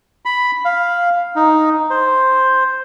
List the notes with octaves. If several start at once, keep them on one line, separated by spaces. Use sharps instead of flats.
B5
F5
D#4
C5